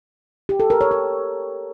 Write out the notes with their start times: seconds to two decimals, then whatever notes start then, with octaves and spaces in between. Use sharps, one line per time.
0.49 G4
0.60 A4
0.70 A#4
0.81 C#5
0.91 A#4